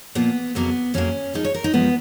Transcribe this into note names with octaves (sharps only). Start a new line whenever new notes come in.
A#2 F3 A#3 B3
F2 C#3 F#3 A#3 B3
F2 C#3 F#3 A#3 C#4
F#2 F3 G#3 D#4
C#5
A#4
D#4
F#2 F3 G#3 B3